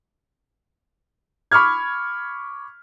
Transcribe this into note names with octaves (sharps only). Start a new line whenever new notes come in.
B5 C#6 D6 F6 G#6